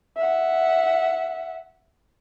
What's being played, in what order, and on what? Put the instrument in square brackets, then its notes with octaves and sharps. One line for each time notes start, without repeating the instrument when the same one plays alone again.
[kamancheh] E5 F#5